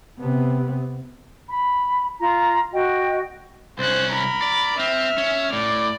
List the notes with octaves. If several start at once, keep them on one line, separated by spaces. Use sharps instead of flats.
C3 B3
B5
F4 A#5
F#4 D#5 G5
C2 C#4 C5 F#6
A#4 B5
D5
C4 E5 F6
C#4
A2 D5